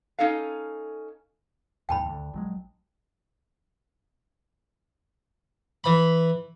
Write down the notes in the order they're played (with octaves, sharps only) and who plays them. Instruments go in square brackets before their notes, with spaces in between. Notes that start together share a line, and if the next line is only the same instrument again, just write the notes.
[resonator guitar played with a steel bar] C#4 D#4 A4 F5
[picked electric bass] A#1 D#2 G#2 [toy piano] G5 A5 B5
[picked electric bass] D2 D3
A#1 F#3 G#3
[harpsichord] E3 B5